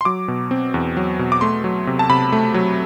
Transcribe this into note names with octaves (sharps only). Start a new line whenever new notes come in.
C6
F#3 D6
B2
C4
E2
F#3
B2
D6
A3 C6
F#3
C3
A5
C3 B5
A3
F#3